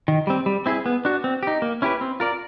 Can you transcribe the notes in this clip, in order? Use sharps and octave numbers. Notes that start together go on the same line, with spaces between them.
D#3
G3 C4
G3
C4 E4 G#4
B3
D4 F#4
C4
D#4 G4
A#3
C#4 E4 G4 B4
C4
F4 A#4 D5